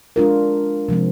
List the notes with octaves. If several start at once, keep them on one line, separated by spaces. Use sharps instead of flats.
G#3 D4 F4 A#4
C3 F3 G#3 C4